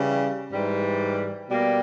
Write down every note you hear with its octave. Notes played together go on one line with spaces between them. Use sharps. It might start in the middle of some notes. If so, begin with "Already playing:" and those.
Already playing: C#3 E3 G3
G#2 E3 G3
B2 G3 A#3